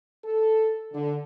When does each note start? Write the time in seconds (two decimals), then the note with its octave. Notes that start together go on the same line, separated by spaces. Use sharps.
0.25 A4
0.93 D3